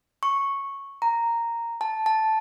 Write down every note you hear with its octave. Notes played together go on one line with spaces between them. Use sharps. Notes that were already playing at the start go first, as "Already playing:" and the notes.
C#6
A#5
A5
A5